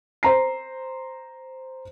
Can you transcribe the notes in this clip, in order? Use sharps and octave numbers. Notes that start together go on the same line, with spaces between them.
C5 A#5 C7